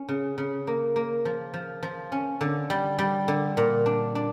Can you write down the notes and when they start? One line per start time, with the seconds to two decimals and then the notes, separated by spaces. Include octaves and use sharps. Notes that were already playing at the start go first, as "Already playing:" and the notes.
Already playing: C#4
0.09 C#3
0.38 C#3
0.67 A#3
0.96 A#3
1.25 F3
1.54 F3
1.83 F3
2.12 C#4
2.41 D3
2.70 G3
2.99 G3
3.28 D3
3.57 A#2
3.86 D4
4.15 D4